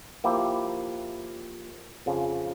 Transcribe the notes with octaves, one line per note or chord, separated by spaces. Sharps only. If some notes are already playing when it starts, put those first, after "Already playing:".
F3 A#3 E4 G4
F2 C#3 F3